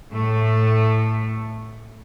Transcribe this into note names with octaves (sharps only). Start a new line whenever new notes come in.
A2 A3